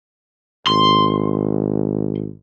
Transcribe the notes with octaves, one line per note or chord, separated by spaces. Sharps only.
G#1 C6